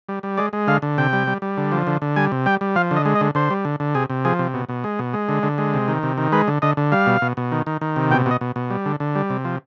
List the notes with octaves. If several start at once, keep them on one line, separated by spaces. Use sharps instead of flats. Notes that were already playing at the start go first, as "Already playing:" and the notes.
G3
G3
G#3 D5
G#3
D3 F5
D3
C3 G5
G3
G3
G3
D3
F3
D3
D3
G3 G#5
C3
G3 G5
G3
F3 F5
D3
D#5
G#3
D#5
D3
D3 C5
G3
D3
D3
C3 G#4
C3
F3 G#4
C3
B2
B2
G#3
B2
G#3
D3
D3
G#3
C3
D#3
C3
D#3
G#3 B4
D3
D3 D#5
D3
G3 F5
B2
B2
B2
D#3
D#3
D#3
C3
B2 G5
B2 D#5
B2
B2
G3
D3
D3
G3
C3
F3